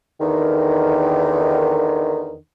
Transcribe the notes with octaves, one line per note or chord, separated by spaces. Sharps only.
E2 D3 D#3